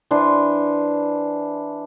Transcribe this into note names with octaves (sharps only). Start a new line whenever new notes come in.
E3 D4 C5